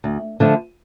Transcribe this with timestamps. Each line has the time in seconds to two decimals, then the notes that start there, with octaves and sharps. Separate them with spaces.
0.04 D2
0.40 D3 F3 A3 D4